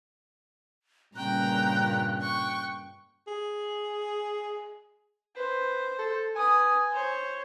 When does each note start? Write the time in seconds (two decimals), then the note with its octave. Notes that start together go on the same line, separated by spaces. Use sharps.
1.16 G2 A#2 C#3 G5 A#5 F#6
2.19 G5 C#6
3.27 G#4
5.36 B4 C5
5.99 A4
6.35 B4 G#5 D#6
6.92 C5 C#5